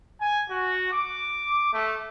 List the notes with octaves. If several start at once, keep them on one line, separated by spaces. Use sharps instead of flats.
G#5
F#4
D6
A3